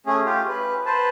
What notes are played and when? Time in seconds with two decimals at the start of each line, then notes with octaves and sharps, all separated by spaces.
0.06 A3 C#4 G#4
0.25 F4 G4
0.48 B4
0.86 B4 C5 A5